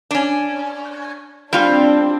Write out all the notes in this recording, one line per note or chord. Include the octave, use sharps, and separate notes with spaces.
C#4 D4
G3 C4 D4 F4